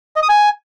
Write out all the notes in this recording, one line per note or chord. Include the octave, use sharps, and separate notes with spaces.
D#5
D#6
G#5